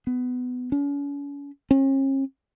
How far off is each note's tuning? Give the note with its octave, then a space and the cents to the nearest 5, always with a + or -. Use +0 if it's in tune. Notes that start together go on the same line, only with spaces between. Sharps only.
B3 +20
C#4 +40
C#4 -40